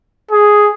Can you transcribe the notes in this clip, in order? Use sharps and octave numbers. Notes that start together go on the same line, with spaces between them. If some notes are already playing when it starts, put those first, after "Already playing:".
G#4